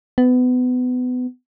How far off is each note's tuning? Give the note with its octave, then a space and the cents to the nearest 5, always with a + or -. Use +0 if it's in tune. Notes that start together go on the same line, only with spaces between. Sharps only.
B3 +25